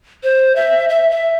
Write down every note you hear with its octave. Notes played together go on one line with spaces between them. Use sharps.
C5
E5
E5
E5